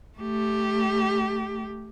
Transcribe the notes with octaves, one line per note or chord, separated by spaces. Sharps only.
A3 G4